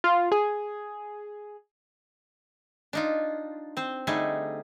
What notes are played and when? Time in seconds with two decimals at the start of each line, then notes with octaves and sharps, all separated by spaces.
0.04 F4
0.32 G#4
2.93 D4 D#4 F4
3.77 C4 C5
4.07 D3 G3 A3 D#4 G#4